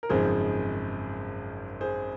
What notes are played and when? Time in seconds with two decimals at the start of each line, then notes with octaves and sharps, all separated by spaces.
0.03 A#4
0.09 G#1 F#2 C#3 F3 G#3 G#4 C5
1.81 G#4 C5